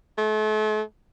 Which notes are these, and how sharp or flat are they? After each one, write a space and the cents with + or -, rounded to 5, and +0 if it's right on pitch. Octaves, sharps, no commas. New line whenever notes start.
A3 -40